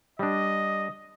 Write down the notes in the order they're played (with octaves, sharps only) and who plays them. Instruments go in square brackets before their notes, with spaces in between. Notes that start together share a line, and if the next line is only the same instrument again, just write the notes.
[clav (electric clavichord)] G3 D4 [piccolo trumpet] D#5